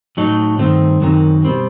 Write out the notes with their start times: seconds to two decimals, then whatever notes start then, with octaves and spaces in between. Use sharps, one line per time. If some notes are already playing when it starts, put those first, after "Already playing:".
0.17 A2 F#3 A3 D#4
0.59 G2 D#3 A3 C4
1.02 F#2 D#3 F#3 C4 D#4
1.44 B2 G3 C4